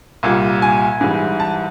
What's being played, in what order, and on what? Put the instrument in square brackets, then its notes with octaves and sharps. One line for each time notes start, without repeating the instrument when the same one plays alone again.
[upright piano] C2 A#2 G3
G#5
G#2 E3 G3
A5